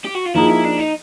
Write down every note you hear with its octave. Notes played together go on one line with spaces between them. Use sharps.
G4
F#4
F4
F3 A#3 D#4 E4 G#4
E4
D4
D#4